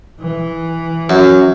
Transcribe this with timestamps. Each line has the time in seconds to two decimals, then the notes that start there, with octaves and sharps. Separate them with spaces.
0.20 E3
1.10 F#2